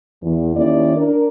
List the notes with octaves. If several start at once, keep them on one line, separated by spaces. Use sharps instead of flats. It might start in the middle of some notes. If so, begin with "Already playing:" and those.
E2
D#2 D#3 C#4 E4 D5
D4 A#4